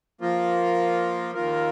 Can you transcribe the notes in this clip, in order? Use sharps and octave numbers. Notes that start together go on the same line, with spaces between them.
F3 A#3 F4
D#2 D#3 A#3 F4 A#4